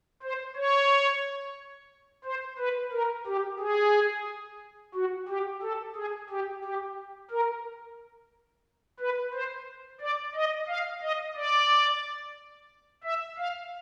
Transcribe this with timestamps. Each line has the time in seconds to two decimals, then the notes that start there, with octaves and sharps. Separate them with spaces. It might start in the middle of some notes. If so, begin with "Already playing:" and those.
0.23 C5
0.56 C#5
2.25 C5
2.59 B4
2.92 A#4
3.26 G4
3.59 G#4
4.95 F#4
5.28 G4
5.63 A4
5.96 G#4
6.29 G4
6.64 G4
7.31 A#4
9.00 B4
9.33 C5
10.01 D5
10.35 D#5
10.68 F5
11.02 D#5
11.36 D5
13.04 E5
13.38 F5